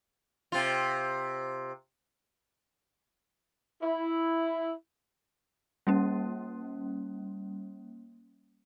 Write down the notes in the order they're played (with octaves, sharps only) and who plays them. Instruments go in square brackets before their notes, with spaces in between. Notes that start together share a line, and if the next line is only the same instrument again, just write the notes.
[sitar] C3 F4
[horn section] E4
[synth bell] G3 A#3 C#4